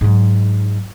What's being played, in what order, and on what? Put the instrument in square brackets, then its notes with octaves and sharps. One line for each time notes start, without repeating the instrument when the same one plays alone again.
[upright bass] G#2 F#3